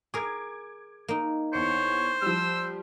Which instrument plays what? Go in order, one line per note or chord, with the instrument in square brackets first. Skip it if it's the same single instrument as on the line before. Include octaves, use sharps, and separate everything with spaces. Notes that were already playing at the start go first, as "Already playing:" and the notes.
[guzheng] G#4 A#4 [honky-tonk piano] D6 G#6
[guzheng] A#3 D#4
[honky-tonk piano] E2 C#7 [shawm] C5 [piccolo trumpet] C#5
[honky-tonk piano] F3 G3 [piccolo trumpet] E6